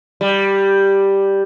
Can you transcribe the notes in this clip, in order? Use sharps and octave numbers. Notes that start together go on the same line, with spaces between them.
G3